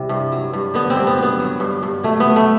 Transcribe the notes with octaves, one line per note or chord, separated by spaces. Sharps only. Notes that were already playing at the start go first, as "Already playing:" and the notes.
Already playing: C3 G3 E4
G2
F#3
G2
D3 B3
C4
G2
B3
F#3
B3
F#3
G2
G2
F#3 A3
F#3 B3
A3